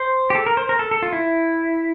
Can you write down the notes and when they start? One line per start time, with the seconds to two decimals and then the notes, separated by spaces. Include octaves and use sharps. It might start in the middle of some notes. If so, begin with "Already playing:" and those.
Already playing: C5
0.30 G4
0.35 A4
0.46 A#4
0.57 C5
0.69 A#4
0.79 A4
0.91 A4
1.02 F4
1.13 E4